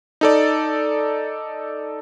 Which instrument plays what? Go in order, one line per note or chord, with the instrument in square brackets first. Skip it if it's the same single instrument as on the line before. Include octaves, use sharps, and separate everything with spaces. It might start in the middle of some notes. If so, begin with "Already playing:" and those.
[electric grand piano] D#4 A4 D5